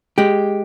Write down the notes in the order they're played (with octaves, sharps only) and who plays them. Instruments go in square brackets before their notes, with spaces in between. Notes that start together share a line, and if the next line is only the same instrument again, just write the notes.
[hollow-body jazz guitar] G#3 G4